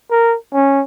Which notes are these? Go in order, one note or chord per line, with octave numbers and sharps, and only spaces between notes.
A#4
C#4